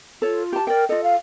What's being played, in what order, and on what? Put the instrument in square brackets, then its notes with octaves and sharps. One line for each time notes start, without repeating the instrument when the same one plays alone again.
[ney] F4 [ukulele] A4 C#5
[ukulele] G4 A5
[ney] A#4 [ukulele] D5 G5
[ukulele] F4 A4 [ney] D#5
[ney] F5